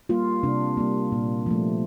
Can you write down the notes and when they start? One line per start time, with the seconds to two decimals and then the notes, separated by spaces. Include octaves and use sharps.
0.09 G3 A#3 F4
0.43 C3 D4
0.77 G3 A#3
1.12 A#2
1.46 F3 A3